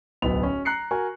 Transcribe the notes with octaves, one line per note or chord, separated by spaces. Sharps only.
D1 B1 B3 B5 F7
C#4
A#5 F#6 C7 C#7
F#4 A#4 G#5